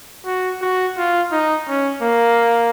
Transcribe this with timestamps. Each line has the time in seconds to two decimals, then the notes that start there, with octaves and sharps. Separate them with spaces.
0.26 F#4
0.61 F#4
0.98 F4
1.32 D#4
1.68 C#4
2.02 A#3